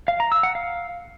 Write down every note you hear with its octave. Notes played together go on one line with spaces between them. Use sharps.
F5
A#5
E6
F#5
F5